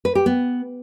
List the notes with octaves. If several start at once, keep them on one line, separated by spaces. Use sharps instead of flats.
B4
G4
B3